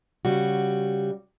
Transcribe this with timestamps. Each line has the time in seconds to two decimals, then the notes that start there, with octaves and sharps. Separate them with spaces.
0.25 C#3 G3 F#4